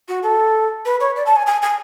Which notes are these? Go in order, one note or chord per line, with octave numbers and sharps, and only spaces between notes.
F#4
A4
B4
C#5
D5
A5
G#5
G#5
G#5